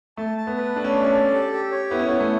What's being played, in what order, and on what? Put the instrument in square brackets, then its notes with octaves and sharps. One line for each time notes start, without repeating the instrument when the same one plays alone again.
[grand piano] A3 [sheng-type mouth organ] A5
[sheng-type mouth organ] A5
[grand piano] B3
[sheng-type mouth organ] B4
[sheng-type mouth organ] A3 [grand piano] D4
[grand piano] C#4
D4
[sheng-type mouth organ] D5
[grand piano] C#4
[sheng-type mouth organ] A4
G4
G4
C#5
[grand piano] B3 [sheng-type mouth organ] E4
[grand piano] C#4
[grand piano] B3 [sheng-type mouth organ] E4
[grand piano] A3